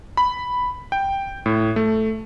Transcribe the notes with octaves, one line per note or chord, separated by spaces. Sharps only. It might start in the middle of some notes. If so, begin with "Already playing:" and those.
B5
G5
A2
A3